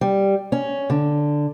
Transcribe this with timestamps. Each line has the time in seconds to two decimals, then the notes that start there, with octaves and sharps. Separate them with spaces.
0.01 G3
0.52 C#4
0.90 D3